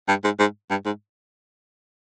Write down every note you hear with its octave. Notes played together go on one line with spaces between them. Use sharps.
G2
G#2
G#2
G2
G#2